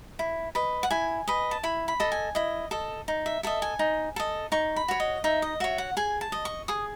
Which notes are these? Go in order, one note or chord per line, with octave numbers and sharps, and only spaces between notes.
E4
B4 D#5
F#5
E4 G#5
B4 D#5
A5
E4 B5
B5
A4 D#5
G#5
E4 D#5
A4 D#5
D#4
E5
A4 D#5 E5
G#5
D#4
A4 D#5
D#4 C#6
B5
F#4 C#5
D#5
D#4 E5
D#5
F#4 C#5 E5
F#5
G#4 G#5
A5
D#5
C#6
G#4 D#6